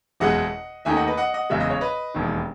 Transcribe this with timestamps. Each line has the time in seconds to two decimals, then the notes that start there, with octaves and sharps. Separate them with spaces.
0.20 F#1 E2 B2 G#3 D#5 F#5
0.85 D#2 D#3 A3 D#4 E5 G#5
0.96 D#5 F#5
1.07 B4 D#5
1.17 D#5 F#5
1.34 D#5 F#5
1.50 F#1 E2 C#3 G#3 E5
1.60 D#5
1.70 C#5
1.81 B4 D#5
2.14 E1 D#2 D#3